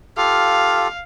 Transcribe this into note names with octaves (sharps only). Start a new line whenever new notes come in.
F4 G4 A4 F5